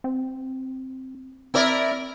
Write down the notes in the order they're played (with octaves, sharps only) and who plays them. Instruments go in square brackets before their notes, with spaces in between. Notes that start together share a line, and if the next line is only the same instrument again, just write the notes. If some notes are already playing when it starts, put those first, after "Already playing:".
[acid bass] C4
[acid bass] C4 [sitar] E4 A#4 D5